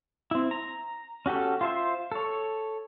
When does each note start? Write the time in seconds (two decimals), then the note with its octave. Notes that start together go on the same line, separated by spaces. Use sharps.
0.31 C4 E4
0.51 A#5
1.26 C#4 F#4 G4 A4
1.61 F4 C5 E5
2.12 A4 C#5